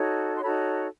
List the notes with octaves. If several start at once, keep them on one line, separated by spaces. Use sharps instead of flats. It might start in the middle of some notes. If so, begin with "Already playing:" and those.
Already playing: D#4 F#4 A4 C#5
C6
D#4 F#4 A4 C#5 B5